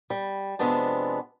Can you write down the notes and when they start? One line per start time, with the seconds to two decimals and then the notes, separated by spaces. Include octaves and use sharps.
0.10 G3
0.59 F2 C3 G#3 B3 D4 A5